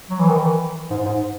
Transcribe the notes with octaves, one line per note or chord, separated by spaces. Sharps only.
F#3
E3
D#3
E3
G#2
G#2